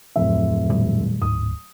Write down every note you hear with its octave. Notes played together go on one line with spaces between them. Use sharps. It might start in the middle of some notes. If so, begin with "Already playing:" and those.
D1 F2 E5
A#2 D#3 G3
D1 G#2 D#6